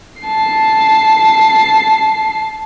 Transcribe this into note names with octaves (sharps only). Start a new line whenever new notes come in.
A5 C7